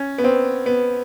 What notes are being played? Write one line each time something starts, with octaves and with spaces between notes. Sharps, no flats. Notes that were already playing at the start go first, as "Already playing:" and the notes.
Already playing: C#4
B3
C4
B3